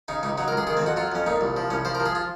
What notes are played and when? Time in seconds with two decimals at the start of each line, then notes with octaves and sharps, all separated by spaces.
0.08 C#3 D#4
0.23 C#2 D#4
0.38 F#3 D#4
0.48 A#4
0.52 C#2 G#4
0.67 D#3 G#4
0.77 C4
0.82 F2 F#4
0.96 F#3 F4
1.12 F2 C#4
1.27 A#2 D#4
1.41 C2
1.57 F3
1.70 C2 C#4
1.85 F3 C5
1.95 A#4
2.00 F3
2.06 G#4
2.15 F4